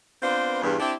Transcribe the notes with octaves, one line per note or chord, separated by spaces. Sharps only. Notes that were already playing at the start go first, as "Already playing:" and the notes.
B3 C4 D4 F4 B4 C5
E2 G2
C4 D4 E4 G4